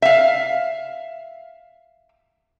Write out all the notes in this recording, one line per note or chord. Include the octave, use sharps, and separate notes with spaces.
E5 F5